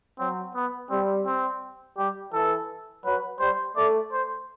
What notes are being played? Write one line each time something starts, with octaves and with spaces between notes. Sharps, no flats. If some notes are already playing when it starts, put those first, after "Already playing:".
F#3 C4
B3
G3 C4
C4
G3 G4
E3 A4
F#3 B4
G3 C5
A3 D5
C5